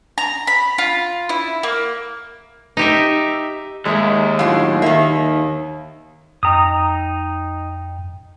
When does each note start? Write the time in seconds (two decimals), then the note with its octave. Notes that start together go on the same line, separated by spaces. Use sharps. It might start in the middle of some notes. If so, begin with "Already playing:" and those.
0.18 A#5
0.47 B5
0.78 F4
1.29 E4
1.63 A#3
2.77 D#4 G4 E5
3.86 D#2 G#3 G#4 E5 A#5
4.39 A2 F#3 D4 F4 F#4 F5
4.82 D#3 A#3 E5
6.43 F2 D#4 G5 A#5 D#6